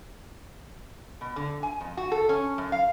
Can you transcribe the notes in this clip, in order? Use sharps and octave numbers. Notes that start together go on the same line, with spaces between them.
B2
D3
G#5
F2
F#4
A4
C#4
F#2
F5